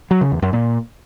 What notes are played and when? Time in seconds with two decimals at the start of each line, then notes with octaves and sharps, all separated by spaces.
0.11 F#3
0.21 C#3
0.32 E2
0.42 F#2
0.53 A#2